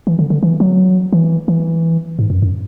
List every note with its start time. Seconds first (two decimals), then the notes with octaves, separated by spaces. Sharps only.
0.07 E3
0.19 D3
0.30 D3
0.43 E3
0.60 F#3
1.13 E3
1.48 E3
2.19 G#2
2.30 F#2
2.42 F#2